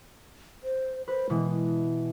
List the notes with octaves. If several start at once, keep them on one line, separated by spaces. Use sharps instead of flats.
C5
B4 C5
B2 E3 G#3